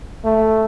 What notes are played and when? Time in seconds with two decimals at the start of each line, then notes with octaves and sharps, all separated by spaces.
0.25 A3